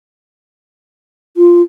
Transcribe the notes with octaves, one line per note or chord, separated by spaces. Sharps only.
F4